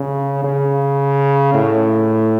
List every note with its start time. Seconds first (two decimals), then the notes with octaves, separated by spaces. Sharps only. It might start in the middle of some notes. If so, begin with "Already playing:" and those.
Already playing: C#3
0.44 C#3
1.54 A2